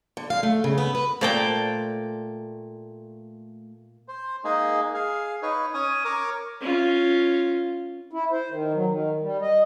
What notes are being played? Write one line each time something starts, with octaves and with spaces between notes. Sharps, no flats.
D3
F5
A3
C#3
B3
B4
A#2 A3 C5 D5 G5 A5
C5
G#3 A#3 D#4 G#4
G#4 F5
D#4 B4 C#5
C#4 C#5 G#5 D#6
A#4 C#5 D6
C#4 F4
E4
C5
D#3
F#3
D#3
G3
D#5